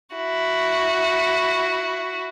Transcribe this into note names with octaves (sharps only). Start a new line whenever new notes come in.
E4 F#4